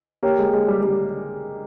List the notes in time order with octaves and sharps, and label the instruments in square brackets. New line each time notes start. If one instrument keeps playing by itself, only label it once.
[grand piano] A#3 [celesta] G4 C#5 G5
[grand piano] G#3
G#3
G3
[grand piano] G3 [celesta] G4